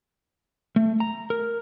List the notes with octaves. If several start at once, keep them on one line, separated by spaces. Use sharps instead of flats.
A3
A#5
A#4